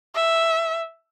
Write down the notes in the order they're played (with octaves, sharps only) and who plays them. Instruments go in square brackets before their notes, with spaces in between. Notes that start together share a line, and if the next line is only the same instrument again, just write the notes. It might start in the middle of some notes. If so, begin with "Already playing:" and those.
[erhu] E5